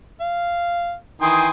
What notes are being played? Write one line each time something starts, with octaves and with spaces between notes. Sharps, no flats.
F5
D#3 E3 G5 G#5 C6 D#6